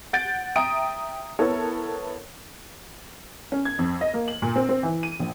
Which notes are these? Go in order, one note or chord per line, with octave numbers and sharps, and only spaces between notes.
F#5 G6 A6 D7
E5 G5 A#5 D#6 D7
B3 E4 A4 A#4 C#5
C#4
G#6
F2
D#5
A#3
F#7
A#2
C4
C4
E3
D#7
A#1